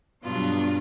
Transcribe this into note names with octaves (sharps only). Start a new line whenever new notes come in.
G2 B2 F#3 B3 D4 F4